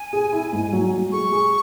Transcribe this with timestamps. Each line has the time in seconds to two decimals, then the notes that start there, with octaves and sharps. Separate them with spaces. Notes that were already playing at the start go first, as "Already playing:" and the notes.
Already playing: G#5
0.13 G#4
0.33 E4
0.53 G#2
0.73 F#3
0.93 F#3
1.12 G#3 C#6
1.32 G#4